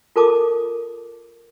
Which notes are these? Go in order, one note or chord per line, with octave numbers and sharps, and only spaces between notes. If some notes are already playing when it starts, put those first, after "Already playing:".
F4 A4 A#4 A5 D6 D#6